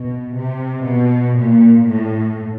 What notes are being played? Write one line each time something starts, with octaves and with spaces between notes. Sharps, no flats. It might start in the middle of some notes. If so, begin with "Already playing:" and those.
Already playing: B2
C3
B2
A#2
A2